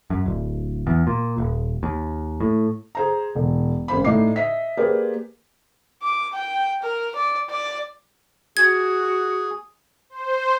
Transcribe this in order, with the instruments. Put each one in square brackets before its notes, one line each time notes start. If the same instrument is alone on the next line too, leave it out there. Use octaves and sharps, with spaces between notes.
[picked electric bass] F#2
D1
E2
A#2
D#1
D#2
A2
[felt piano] G#4 C5 A#5
E1
G#1 C#3 C5 B5
A2 D#4 D5 D#5 D6 C7
D#5 E5 B6
A#3 G4 G#4 B4 C5 D5
[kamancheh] D6
G5
A#4
D5
D5
[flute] F#4 [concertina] G#4 [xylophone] G#6
[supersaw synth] C5